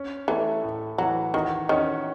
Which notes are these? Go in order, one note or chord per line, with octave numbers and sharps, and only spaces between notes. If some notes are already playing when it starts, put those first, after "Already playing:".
Already playing: C#4
E3 A3
A2
E3 F#3
D#3 F#4
D#3 C#4